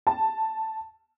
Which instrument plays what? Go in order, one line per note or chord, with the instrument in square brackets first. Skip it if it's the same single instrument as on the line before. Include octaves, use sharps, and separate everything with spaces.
[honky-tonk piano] A5